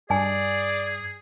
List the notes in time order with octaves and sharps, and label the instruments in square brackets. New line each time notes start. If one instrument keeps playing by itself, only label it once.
[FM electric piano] G2 [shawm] G#4 [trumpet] D5 [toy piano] D#5 G#5